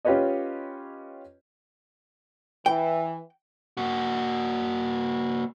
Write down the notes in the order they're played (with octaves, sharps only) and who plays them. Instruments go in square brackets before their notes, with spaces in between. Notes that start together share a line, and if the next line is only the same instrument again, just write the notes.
[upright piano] C#4 F4 G4 B4 C#5 D#5
[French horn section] E3 [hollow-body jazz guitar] G5
[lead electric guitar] A#3 F#4